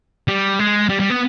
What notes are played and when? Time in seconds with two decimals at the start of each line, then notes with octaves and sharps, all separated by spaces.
0.28 G3
0.59 G#3
0.89 G3
1.00 G3
1.10 B3